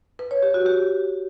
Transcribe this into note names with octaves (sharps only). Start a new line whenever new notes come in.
B4
C#5
G4
F#4
G4